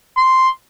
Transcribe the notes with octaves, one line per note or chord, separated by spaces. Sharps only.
C6